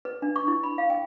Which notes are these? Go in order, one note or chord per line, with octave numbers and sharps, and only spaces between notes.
B4
D4
C#6
E4
B5
F5
G5